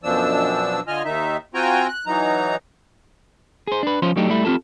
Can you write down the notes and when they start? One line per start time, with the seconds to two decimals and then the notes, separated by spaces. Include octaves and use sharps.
0.03 F#2 B2 F3 D4 E6
0.87 D3 F4 D#5 G#5 F6
1.05 D#2 D#3 D#4 E5
1.54 C4 F4 F#4 G5 G#5 A#5
1.88 F#6
2.06 E3 F#3 D#4 A#5
3.67 G#4 C5
3.83 D4 B4
4.02 F3 C#4 F4 C5
4.16 F#3 A3 D4 D#4 G4
4.29 G3 A3 E4
4.45 C4 F4 G4 A4